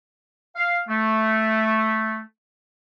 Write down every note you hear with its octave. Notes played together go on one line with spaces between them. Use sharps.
F5
A3